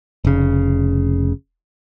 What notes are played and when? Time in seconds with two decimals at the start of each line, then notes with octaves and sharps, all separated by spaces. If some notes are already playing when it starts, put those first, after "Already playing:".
0.25 F1 C#3